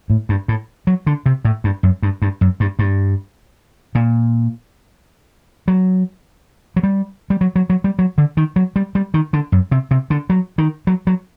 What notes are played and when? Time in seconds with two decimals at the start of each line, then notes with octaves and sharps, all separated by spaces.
0.10 A2
0.29 G2
0.48 A2
0.87 F#3
1.07 D3
1.26 C3
1.45 A2
1.64 G2
1.83 F#2
2.03 G2
2.22 G2
2.41 F#2
2.60 G2
2.79 G2
3.95 A#2
5.68 F#3
6.76 F#3
6.83 G3
7.30 G3
7.41 F#3
7.56 F#3
7.70 F#3
7.84 G3
7.99 F#3
8.18 D3
8.37 D#3
8.56 F#3
8.76 G3
8.95 G3
9.14 D#3
9.33 D3
9.52 F#2
9.71 C3
9.91 C3
10.10 D3
10.30 F#3
10.58 D#3
10.87 F#3
11.07 F#3